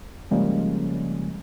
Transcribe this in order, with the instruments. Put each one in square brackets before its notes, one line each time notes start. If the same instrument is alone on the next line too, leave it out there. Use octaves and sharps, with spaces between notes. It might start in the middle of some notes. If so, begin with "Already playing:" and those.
[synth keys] C#3 F3 G3 G#3 A#3 C#4